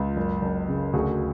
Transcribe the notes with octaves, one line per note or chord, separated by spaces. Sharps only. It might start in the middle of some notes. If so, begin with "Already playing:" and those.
Already playing: C#2 F4
F#1
F#1
C#3
D2 F#4 G#4